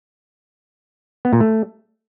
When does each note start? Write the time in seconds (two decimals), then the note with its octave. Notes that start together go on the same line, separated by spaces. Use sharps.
1.25 B3
1.33 A#2
1.40 A3